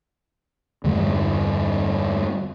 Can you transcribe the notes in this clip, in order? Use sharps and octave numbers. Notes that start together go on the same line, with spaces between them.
E2 G2 D3 G3